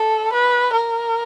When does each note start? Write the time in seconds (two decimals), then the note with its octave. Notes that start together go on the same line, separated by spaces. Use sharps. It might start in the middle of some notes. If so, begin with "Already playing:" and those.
Already playing: A4
0.33 B4
0.73 A#4